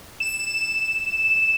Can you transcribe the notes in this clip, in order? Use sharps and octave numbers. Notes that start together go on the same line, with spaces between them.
E7